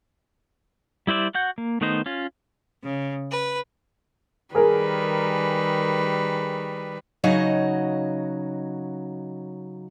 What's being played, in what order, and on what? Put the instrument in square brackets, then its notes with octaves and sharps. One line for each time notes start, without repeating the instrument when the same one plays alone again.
[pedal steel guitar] G3 E4 C5 D5 E5
F#4 F#5 G6
A#3
D#3 A3 B3 D#4 C5
C#4 F4
[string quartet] C#3
B4
[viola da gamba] D#3 G3 B4 [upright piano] G#4 A#4
[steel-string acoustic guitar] C#3 F#3 D#4 F#4 C#5 D#5